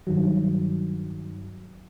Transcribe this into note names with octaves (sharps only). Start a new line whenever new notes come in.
G2 D#3 F#3